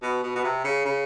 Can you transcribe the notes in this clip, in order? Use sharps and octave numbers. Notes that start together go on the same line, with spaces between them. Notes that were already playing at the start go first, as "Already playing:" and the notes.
B2
B2
B2
C3
C#3
C#3